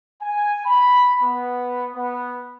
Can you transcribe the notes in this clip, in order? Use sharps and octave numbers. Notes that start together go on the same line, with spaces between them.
G#5
B5
B3
B3